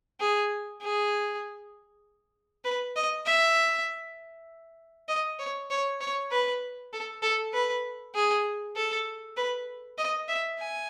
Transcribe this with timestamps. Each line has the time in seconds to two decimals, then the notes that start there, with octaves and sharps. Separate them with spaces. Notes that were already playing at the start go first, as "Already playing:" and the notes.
0.20 G#4
0.82 G#4
2.64 B4
2.96 D#5
3.26 E5
5.09 D#5
5.39 C#5
5.70 C#5
6.01 C#5
6.31 B4
6.93 A4
7.22 A4
7.53 B4
8.15 G#4
8.76 A4
9.37 B4
9.98 D#5
10.28 E5
10.59 G#5